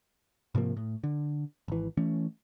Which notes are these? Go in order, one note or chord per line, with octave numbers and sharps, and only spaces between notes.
G#2 C3 F3 A#3
A2
D3
G#1 E3
E3 A3 C#4